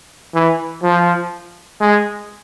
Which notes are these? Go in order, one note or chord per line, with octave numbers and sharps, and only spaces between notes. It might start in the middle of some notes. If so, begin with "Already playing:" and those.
E3
F3
G#3